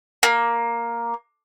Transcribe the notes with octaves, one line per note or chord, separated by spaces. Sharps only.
A#3